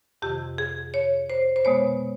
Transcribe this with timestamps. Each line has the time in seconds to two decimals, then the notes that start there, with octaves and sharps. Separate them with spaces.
0.22 F2 C3 D#3 G4
0.58 G#4
0.94 C#5
1.30 C5
1.56 C5
1.65 B2 G#3 B3 C#5